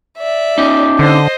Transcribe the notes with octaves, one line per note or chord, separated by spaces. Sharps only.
D5 E5
C#4 D#4 G4
D3 C5 D#5